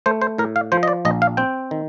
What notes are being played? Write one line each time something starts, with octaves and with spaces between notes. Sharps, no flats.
A3 C5
C5
A2 A#4
F5
F3 C5
D#5
D5
A#1 D#5
F5
C4 G5
D#3